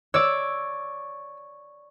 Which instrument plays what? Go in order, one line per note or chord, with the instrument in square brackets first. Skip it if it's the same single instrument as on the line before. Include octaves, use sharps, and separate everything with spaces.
[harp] C#5 D5 [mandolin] E6